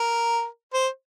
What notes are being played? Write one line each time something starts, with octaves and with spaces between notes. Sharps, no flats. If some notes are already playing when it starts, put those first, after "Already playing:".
Already playing: A#4
C5